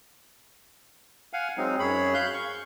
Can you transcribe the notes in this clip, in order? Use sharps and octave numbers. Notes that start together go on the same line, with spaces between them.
F5 F#5 G#5
F#3 G#3 C4 D#4
F#2 G#4 C#5 B5
F5 F#6 G6
C#6